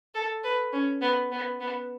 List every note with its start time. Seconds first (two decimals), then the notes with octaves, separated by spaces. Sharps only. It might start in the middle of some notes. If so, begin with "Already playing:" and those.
0.15 A4
0.44 B4
0.73 C#4
1.02 B3
1.32 B3
1.60 B3